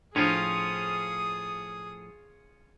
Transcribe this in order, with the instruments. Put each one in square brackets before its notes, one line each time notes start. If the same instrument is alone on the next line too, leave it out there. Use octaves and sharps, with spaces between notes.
[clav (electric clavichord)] A2 F3 [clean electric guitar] C#4 F4 [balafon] D4 [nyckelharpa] G#4 D#6